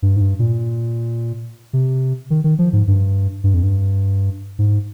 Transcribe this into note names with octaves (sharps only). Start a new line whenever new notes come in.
G2
G#2
G2
A#2
C3
D#3
D#3
F3
G#2
G2
G2
F2
G2
G#2